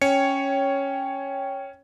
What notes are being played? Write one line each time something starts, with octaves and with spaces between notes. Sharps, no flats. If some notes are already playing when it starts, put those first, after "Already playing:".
C#4 C#5 G5 C#7